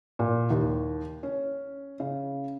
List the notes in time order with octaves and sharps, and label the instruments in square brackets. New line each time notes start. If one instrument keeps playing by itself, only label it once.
[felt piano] A#2
D#2
C#4
C#3